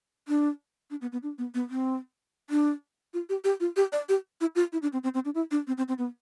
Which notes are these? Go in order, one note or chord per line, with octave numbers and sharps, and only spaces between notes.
D4
D4
B3
B3
D4
B3
B3
C4
D4
F4
G4
G4
F4
G4
D5
G4
E4
F4
E4
D4
C4
C4
C4
D4
E4
D4
C4
C4
C4
B3